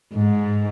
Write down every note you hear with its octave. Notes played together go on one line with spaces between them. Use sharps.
G#2